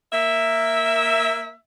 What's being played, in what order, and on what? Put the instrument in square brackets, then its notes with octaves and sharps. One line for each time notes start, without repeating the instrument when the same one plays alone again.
[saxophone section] A#3 E5